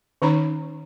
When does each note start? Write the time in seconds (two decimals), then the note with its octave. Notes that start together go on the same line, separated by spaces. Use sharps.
0.22 D#3 C#4 D#4 C#5 A#5 B5